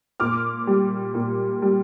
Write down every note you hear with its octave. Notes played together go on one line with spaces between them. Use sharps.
A#2 D6 F6
G3
A#2
G3